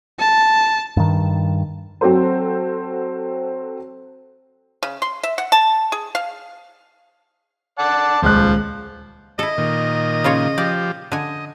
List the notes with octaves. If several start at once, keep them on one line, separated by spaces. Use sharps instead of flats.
A5
G2 D#3
F#3 C4 F#4 A4 C5
C#3
C6
E5
F#5
A5
G#4
F5
D5 F#5 A5
D#1 C#2 F3 F#6
E4 A4 D#5
A#2 D#3
C#3 F4 C#5
F3 G4 D5
D3 D#5 G#5